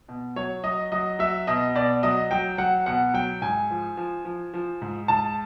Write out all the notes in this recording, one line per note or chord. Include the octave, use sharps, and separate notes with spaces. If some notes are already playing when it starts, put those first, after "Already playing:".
B2
F#3 C#5
F#3 D#5
F#3 D#5
F#3 E5
B2 D#5
B2 D5
F#3 D#5
F#3 G5
F#3 F#5
B2 F#5
F#3 G5
G#2 G#5
F3
F3
F3
F3
G#2
G#2 A5